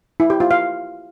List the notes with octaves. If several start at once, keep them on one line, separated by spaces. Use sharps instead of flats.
E4
G4
F4
F5